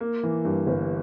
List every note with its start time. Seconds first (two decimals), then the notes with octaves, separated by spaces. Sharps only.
0.01 A#3
0.23 E3
0.45 G2
0.67 G1